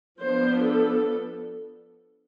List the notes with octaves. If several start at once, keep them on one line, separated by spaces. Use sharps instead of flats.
F3 B3 D4 C5
A4